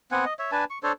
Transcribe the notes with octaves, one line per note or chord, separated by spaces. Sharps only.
B3 C4 F#5 G#5
D#5
C#5 E5
D4 B4 G#5 A5
C#6
D4 A4 C5 C#5